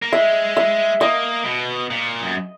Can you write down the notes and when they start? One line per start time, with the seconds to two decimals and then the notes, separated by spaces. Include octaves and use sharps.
0.03 A#3
0.12 G#3 E5
0.57 E5
1.01 A#3 D#5
1.45 B2
1.91 A#2
2.22 F#2